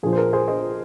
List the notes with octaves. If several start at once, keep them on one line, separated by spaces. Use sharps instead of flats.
A#1 A#2 F3 G#4
C5
A#4
G#4 C5
C5 D#5